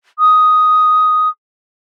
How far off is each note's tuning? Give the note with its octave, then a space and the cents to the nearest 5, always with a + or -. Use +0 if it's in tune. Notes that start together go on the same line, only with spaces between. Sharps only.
D#6 +5